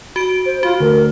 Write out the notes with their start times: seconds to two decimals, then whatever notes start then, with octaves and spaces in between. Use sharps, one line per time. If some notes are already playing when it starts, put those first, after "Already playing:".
0.16 F#4 D7
0.46 C5
0.63 F4 F#4
0.80 D2 A#4